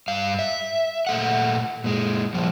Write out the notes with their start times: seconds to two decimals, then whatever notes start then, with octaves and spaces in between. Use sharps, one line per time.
0.08 G2 F5
0.39 E5
1.07 A#2 A3 F#5
1.84 A#2 G#3
2.34 A#2 F3 G3